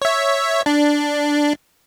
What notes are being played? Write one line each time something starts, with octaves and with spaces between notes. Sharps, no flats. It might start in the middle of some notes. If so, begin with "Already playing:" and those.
C#5 E5
D4